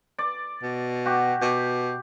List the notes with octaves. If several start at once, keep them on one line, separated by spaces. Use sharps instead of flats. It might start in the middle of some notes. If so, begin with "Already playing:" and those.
D5
B2
F#4 G4
B2 G4